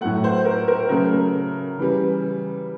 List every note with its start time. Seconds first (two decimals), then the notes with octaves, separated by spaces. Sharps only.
0.01 A2 F#3 A3 F#5
0.24 C5
0.45 A#4
0.68 A#4
0.89 C#3 F#3 A3 A#4
1.78 C#3 E3 G3